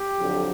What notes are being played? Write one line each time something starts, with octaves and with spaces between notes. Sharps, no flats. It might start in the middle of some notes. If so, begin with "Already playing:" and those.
Already playing: G4
F2 D3 F#3